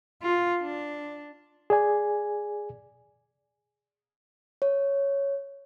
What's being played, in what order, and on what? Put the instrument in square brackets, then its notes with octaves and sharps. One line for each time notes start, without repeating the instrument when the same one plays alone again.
[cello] F4
D4
[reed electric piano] G#4 D5 G#5
[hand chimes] C#5